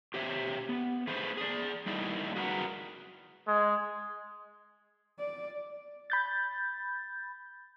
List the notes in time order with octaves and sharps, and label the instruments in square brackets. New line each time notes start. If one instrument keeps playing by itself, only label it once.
[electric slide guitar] G4 C5 C#5 E5
B3
A3 G#4 B4 C5
G#4 D5
G3 A3 A#3 D#4 E4
F#4 G#4 A#4 B4 F#5
[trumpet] G#3
[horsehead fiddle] D5
[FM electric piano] B5 G6 A6